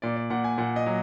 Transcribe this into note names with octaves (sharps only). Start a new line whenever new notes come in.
A#2 D5
D5
A#2 F#5
G#5
A#2 F#5
D#5
F#3